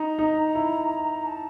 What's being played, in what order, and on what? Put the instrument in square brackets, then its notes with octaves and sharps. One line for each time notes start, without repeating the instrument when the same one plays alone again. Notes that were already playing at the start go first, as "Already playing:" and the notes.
Already playing: [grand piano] D#4 [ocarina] A#5
[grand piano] D#4
E4
[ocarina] A5